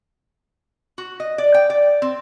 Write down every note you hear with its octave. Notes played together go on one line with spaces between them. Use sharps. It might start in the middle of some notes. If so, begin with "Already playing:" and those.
F#4
D#5
D5
G5
D5
C4